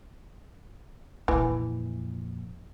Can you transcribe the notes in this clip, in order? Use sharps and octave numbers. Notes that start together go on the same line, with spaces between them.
F2 A#2 E3